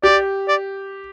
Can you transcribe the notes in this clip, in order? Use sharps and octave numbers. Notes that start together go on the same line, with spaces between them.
G4 D5
D5